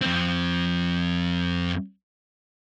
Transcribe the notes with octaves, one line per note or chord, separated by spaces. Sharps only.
F2 C4